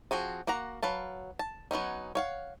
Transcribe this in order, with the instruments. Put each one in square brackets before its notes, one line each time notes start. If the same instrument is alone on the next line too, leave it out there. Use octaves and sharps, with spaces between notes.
[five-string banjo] F3 C4 F#4 G#4
A#3 F#4 F#5 A#5
F#3 B4 F5 A5
A5
F#3 B3 C#4 D#4
C#5 F5 F#5